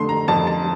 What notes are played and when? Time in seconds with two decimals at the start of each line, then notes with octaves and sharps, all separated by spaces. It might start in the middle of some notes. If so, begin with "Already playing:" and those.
Already playing: F2 D3 A3 C6
0.09 A#5
0.28 F2 A5
0.47 A5